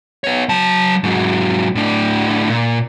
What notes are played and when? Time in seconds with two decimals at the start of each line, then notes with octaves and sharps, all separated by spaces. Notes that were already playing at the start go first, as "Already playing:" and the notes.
0.24 B3 C#5
0.49 F#3 A5
1.04 G#2 F#3
1.75 A2 D4
2.49 A#2